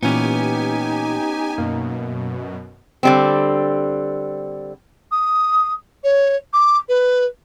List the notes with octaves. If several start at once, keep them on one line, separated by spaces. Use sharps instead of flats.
A#2 E3 B3 C#4 D#4 G4 G#5
F#2 B2 A#3
D3 G3 C4
D#6
C#5
D6
B4